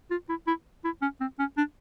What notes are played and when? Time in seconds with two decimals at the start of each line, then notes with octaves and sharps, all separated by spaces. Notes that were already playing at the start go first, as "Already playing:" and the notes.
0.11 F4
0.29 E4
0.47 E4
0.84 E4
1.02 C#4
1.21 C4
1.39 C#4
1.57 D4